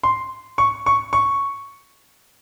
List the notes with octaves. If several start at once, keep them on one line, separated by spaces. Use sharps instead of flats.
C6
C#6
C#6
C#6